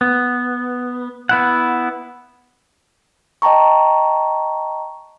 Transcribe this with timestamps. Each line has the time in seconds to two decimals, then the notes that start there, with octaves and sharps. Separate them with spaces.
0.01 B3
1.29 B3 E4 F#5
3.42 D#5 G5 A5 A#5 C#6